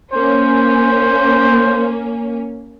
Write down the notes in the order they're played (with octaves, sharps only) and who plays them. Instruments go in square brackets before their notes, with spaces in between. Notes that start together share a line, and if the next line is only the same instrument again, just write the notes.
[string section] A#3 C#4 [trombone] C5